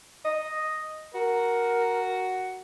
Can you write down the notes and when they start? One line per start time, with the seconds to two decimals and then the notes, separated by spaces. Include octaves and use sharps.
0.25 D#5
1.15 F#4 A#4